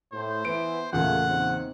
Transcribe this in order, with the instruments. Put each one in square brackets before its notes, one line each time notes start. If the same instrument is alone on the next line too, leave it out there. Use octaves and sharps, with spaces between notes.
[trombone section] A2 [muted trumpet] C5
[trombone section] E3 B3 [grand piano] D7
[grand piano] E2 A#2 C#3 [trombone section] A3 A#3 F4 [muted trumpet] F#5
[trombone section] C4 D#4